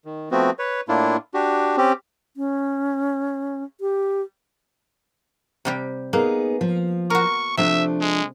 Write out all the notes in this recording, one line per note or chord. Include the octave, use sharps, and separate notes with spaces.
D#3
F3 A3 B3 C4 F#4
B4 C#5
A2 A#3 D4 E4 F4
D4 F#4 G4
C4 C#4 G4
C#4
G4
C3 G3 G4
A#3 B3 D#4 G#4
F3
F#4 A#4 C#6
C3 F3 A3 D4 E5
G#3